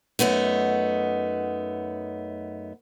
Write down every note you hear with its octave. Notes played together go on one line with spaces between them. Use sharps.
F#2 A3 B3 D#4